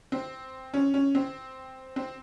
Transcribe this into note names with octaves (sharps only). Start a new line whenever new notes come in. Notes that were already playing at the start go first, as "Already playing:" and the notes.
C4
C#4
C#4
C4
C4